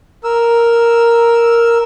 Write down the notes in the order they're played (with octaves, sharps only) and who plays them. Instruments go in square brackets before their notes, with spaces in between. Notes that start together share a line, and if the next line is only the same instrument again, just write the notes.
[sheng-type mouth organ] A#4 E6